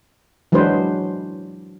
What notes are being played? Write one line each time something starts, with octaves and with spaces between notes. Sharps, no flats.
E3 F#3 G#3 D4 B4 C5